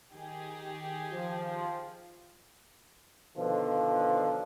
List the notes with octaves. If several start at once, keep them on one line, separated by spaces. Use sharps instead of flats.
D#3 G4 G#4
F3
B2 D3 D#3 F3